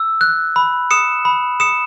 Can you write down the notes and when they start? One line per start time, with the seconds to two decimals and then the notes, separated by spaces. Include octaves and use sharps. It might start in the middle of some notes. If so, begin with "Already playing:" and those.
Already playing: E6
0.21 F#6
0.56 B5
0.91 D#6 C#7 E7
1.25 B5
1.60 D#6 C#7 E7